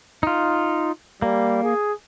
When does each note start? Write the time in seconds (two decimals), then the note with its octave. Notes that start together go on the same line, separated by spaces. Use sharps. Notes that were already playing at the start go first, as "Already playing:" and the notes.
0.23 D#4 F4
1.22 G3 A#3
1.63 G#4